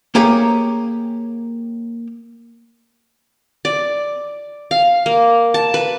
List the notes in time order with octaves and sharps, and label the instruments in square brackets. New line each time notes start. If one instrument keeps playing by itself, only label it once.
[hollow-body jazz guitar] A#3 G4 G#4 C#5 A#5
[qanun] D5
F5
A#3
A5
B4